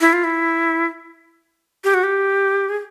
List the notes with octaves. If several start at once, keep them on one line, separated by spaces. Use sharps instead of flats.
E4
F4
E4
G4
F#4
G4
G#4